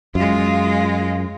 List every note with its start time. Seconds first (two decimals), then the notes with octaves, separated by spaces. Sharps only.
0.15 F#2 G#3 F4